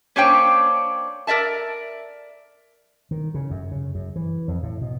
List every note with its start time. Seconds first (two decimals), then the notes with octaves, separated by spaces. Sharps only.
0.16 A#3 C#4 D4 C5 C#5 G5
1.27 A#4 D5 E5 A5
3.11 D#3
3.34 C#3
3.51 F#2
3.71 C#3
3.95 F#2
4.16 E3
4.48 F2
4.63 A2
4.81 B2